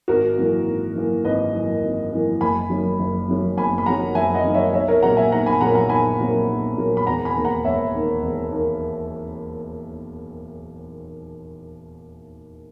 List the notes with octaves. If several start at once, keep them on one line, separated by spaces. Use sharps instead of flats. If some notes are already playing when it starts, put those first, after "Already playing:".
G#1 F#4 A#4
F#2 E3 A#3
G#1
F#2 E3 A#3
G#1 B4 D#5
F#2 E3 A#3
G#1
F#2 E3 A#3
F#1 G#5 B5
F#2 D#3 F#3
F#1
F#2 D#3 F#3
F#1 G#5 B5
B5
F#2 D#3 F#3 F#5 A#5
F#1 E5 G#5
D#5 F#5
F#2 D#3 F#3
C#5 E5
B1 C#5 E5
A#4 C#5
A#2 F#3 A#3 F#5 A#5
E5 G#5
B1 F#5 A#5
G#5 B5
A#2 F#3 A#3 F#5 A#5
F#5 A#5
B1 G#5 B5
A#2 F#3 A#3
B1
A#2 F#3 A#3
B5
E1 F#5 A#5
G#5 B5
D#2 D#3 A#3
F#5 A#5
E1 C#5 E5
D#2 D#3 A#3
E1
D#2 D#3 A#3